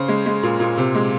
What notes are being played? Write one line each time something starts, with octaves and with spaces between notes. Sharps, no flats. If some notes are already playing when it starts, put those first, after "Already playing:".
Already playing: C#3 C5
G#3
G#3
A#2
A#2
C3
G#3